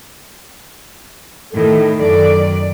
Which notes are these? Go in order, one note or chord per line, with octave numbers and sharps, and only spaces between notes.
A2 D#3 A4
F#2 D#3 D5